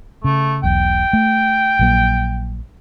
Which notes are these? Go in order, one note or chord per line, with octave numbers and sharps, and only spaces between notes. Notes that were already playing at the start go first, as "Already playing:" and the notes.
C#3 A3
E1 B1 G5
A3
A#1 F#3 A#3